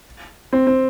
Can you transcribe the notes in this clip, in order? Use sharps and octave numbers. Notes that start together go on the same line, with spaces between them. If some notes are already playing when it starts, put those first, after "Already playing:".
C4
C4